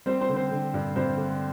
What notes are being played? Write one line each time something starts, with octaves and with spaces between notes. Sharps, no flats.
G3 C4 C5
C4 C5
D3
C4 C5
D3
G2
G2 C4 C5
D3